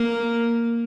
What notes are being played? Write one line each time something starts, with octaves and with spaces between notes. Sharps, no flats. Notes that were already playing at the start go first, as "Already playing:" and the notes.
Already playing: A#3